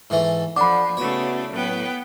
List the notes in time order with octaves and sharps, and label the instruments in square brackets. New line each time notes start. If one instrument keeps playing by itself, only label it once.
[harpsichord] G#2 E3 A3
[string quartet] F3 [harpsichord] D4 [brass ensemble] A4 D5 F#5 [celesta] B5 D6
[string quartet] C#3 A3 D5 [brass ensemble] B3 E4 F#4 [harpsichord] C#5
[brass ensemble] A2 F#3 [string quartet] B3 B4 G5